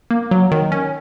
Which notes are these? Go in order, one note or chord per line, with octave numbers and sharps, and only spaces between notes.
A#3
F#3
D#3
C#4